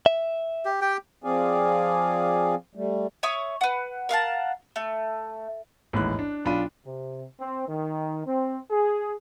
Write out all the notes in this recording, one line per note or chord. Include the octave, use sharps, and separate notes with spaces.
E5
G4
G4 G5
F3 C4 G#4 D5 F5 G#5
G3 A3
C#5 E5 C#6 D#6
B4 F#5
A#4 F5 F#5 A5
A3
A1 D#2 G#2 F#6
D4
B1 D4 F4 B5 D#7
C3
C4
D#3
C4
G#4